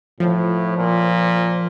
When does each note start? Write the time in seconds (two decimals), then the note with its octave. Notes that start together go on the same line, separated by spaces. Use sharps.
0.20 A2 F3
0.77 A#2